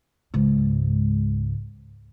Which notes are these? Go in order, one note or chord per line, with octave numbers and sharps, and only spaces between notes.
C#2 G#2